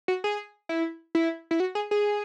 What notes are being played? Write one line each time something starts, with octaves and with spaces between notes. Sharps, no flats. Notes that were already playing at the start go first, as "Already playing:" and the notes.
F#4
G#4
E4
E4
E4
F#4
G#4
G#4